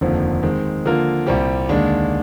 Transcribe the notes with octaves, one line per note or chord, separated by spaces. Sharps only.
F1 D#2 D3 F3 C4
D#3 G#3 C4
D3 F3 A#3 F4 A#4
C2 A#2 G3 C4 G4
D#2 D3 G#3 D4